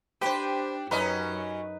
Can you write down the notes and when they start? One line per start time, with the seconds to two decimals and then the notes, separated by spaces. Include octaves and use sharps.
0.21 D4 G4 B4 C5
0.91 F#2 F#3 C#4 D#4 B4 D#5